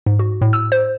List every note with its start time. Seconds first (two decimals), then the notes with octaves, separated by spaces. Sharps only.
0.06 G#2
0.19 F#4
0.41 A2
0.53 E6
0.72 C5